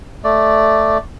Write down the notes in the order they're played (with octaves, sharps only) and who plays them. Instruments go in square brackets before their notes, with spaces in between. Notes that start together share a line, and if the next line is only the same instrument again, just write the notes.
[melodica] A3 D5